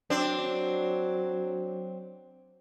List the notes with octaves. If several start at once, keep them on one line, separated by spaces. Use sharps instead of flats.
F#3 C4 D4